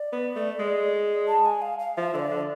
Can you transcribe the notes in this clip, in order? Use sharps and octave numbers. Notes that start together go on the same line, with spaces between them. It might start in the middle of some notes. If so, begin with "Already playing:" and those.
Already playing: D5
B3
A3
G#3
A5
G#5
F5
F5
F3 E5
D3 C5
D5
D3